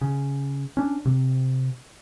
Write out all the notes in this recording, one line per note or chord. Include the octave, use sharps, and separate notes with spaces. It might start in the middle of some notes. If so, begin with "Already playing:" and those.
C#3
C#4 D4
C3